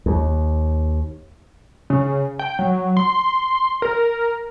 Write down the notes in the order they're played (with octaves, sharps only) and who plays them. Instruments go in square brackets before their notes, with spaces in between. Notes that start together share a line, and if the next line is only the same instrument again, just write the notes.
[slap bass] D#2
[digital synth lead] C#3
G5
F#3
C6
A#4